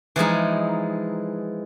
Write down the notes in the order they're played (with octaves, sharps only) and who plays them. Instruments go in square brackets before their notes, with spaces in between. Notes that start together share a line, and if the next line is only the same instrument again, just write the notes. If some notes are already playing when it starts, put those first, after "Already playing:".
[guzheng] E3 F3 G#3 D#4